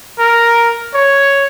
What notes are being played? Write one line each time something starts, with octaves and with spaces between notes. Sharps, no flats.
A#4
C#5